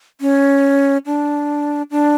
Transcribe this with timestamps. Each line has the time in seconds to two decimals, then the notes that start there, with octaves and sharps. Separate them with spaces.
0.21 C#4
1.06 D4
1.91 D4